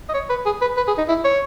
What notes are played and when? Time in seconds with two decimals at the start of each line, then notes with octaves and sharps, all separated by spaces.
0.09 D#5
0.14 C#5
0.30 B4
0.46 G#4
0.61 B4
0.77 B4
0.87 G#4
0.98 D#4
1.08 E4
1.24 C#5